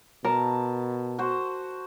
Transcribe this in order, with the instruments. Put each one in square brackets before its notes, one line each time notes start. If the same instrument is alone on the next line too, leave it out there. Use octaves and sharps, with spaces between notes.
[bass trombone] B2 [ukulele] A#4 [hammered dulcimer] A5
[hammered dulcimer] F#4 C5